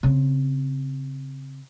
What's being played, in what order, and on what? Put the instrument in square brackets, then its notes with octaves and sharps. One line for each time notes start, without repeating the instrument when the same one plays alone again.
[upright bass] C#3 C4